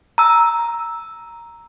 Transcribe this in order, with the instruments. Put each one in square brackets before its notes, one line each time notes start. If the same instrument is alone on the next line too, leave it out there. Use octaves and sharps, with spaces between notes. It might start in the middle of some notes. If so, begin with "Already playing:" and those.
[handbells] A#5 E6